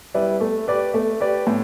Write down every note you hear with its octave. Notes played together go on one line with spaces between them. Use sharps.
G3 E4 B4 D5
A3
G4 B4 D5
A3
G4 B4 D5
A2